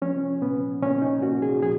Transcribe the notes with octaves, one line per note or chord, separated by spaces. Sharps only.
F3 C#4
A#2 B3
A#2 C#4
D#4
A#2 F#4
G#4
F3 G#4